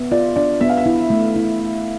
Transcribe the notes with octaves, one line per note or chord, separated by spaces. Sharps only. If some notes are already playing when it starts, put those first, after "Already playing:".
Already playing: B3 E5
F4 D5
D4 D5
B3 E5
F5
E5
E4
A3
E4